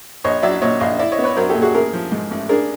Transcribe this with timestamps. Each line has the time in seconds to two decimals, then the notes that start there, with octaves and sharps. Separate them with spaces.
0.24 A#1 C#5 D#5
0.43 F#3 D5 E5
0.62 A#2 C#5 D#5
0.80 A#1 D#5 F5
0.99 E4 D5 E5
1.12 C#5 D#5
1.19 B3
1.24 B4 C#5
1.37 F#3 A#4 C5
1.49 G4 A4
1.55 A#2
1.62 F#4 G#4
1.74 A1 G#4 A#4
1.93 F3
2.12 G#2
2.31 A1
2.49 D4 G#4 A#4